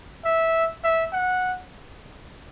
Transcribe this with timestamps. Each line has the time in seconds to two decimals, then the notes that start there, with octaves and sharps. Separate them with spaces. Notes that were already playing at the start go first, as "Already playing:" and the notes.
0.25 E5
0.84 E5
1.13 F#5